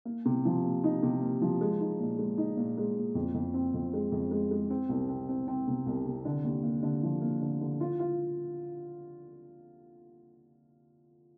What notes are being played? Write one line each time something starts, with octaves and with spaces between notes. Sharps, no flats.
A#3
C3
F3
A#3
D#4
C3
A#3
F3
G#3
D#4
A#2
G#3
D#4
A#2
G#3
A#2
F2
F2
C4
F2
G#3
F2
G#3
G#3
C4
C2
C4
C4
C4
C3
C2
C3
D3
D#2
A#3
D3
F3
A#3
D3
D3
F4
F4